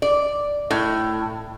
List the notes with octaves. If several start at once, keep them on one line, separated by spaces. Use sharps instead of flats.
D5
A2